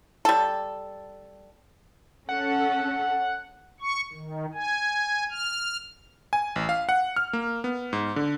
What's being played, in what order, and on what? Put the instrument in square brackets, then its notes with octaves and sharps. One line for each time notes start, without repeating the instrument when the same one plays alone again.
[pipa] G3 A4
[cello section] C#4 A4 [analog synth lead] F#5
[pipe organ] C#6
D#3
G#5
F6
[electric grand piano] G#5
A1
F5
F#5
F6
A#3
B3
G#2
D3